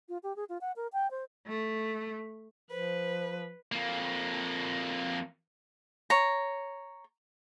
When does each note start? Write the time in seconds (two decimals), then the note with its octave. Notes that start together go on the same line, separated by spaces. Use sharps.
0.09 F4
0.23 G4
0.36 G#4
0.49 F4
0.61 F#5
0.76 A#4
0.93 G5
1.11 C5
1.46 A3
2.71 F3 B4 C5
3.72 F2 A#3
6.10 C#5 A#5